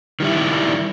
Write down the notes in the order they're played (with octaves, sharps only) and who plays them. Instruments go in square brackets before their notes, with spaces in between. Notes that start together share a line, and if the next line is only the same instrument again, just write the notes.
[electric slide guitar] D#3 G3 E4